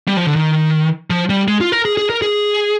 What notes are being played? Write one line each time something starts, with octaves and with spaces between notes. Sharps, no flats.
G3
F3
D3
D#3
F3
G3
G#3
F4
A#4
G#4
G#4
A#4
G#4